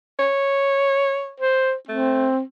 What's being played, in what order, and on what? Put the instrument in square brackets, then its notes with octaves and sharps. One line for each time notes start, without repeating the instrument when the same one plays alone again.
[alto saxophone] C#5
[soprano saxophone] C5
[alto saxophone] A3 [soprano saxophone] C4